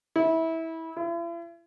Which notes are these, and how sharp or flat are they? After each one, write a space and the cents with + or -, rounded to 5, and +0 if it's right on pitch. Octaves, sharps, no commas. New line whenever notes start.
E4 -20
E4 +45